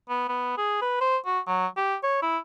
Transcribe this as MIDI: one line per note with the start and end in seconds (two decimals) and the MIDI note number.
0.09 0.24 59
0.29 0.55 59
0.57 0.80 68
0.82 0.97 71
1.01 1.17 72
1.26 1.39 66
1.47 1.67 54
1.77 1.96 67
2.03 2.18 73
2.22 2.38 64